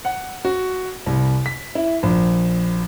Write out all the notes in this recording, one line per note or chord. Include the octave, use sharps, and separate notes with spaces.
F#5
F#4
C2
B6
E4
A#1